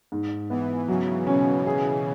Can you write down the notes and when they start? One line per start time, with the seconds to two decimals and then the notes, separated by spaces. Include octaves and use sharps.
0.12 G#2
0.50 E3 B3
0.88 C#3 F#3
1.27 B2 C#4
1.66 G#4